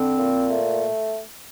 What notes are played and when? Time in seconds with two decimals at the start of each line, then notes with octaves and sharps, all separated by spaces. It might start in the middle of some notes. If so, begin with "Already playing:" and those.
Already playing: D3 C4
0.17 A#2
0.49 A3